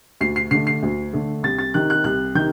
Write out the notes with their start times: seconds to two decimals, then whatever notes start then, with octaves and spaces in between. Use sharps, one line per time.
0.21 D2 C7
0.36 C7
0.51 D3 A3 C7
0.67 C7
0.83 D2
1.13 D3 A3
1.43 C2 A6
1.59 A6
1.74 C3 D#3 F#6
1.90 F#6
2.04 C2 F#6
2.35 C3 D#3 G6